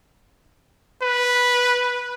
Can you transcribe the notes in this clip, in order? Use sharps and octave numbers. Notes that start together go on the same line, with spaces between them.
B4